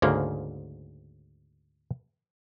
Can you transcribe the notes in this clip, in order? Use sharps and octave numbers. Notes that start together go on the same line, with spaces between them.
D2 G#2 C#3 A#3